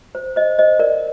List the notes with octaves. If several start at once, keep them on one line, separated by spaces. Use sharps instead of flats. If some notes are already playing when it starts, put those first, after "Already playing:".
C5
C5 D#5
C5 D#5
A#4 D5